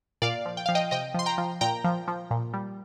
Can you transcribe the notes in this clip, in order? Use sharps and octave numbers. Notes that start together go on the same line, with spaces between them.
A#2 D5 F5
F3
G5
F3 F5
D#5 G5
C3 D#5 G5
F3 C6
G5 A#5
F3
A#2 G5 A#5
F3
F3
A#2
G3